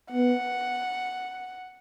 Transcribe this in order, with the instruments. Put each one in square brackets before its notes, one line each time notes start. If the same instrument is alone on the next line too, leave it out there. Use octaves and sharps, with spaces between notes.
[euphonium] B3 [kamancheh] F#5